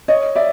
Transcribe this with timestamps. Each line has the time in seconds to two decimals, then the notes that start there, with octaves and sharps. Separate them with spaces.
0.08 C#5 D#5
0.36 D5 E5